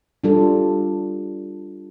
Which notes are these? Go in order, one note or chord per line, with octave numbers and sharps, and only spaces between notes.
G3 D4 F4 A4